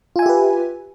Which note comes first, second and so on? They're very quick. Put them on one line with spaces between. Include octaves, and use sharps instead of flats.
F4 G#5 E5 G4 B4